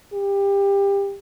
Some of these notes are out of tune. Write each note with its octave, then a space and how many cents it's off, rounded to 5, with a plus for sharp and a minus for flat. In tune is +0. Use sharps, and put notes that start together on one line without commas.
G4 +25